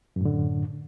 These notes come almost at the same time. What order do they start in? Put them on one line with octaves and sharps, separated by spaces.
F#2 A2 D3